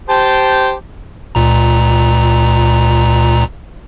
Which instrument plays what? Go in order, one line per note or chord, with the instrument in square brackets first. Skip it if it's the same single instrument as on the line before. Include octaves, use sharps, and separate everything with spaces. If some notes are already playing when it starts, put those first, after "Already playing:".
[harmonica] G4 C5 A5
[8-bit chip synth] C#2 A#2 A#5